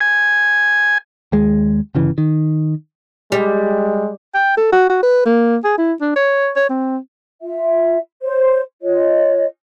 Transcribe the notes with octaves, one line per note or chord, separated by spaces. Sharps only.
G#5
D#2 G#3
G1 C#3 E3
D#3
G3 G#3
G5
A4
F#4
F#4
B4
A#3
G#4
E4
D4
C#5
C#5
C4
F4 E5
C5 C#5
F4 C#5 D#5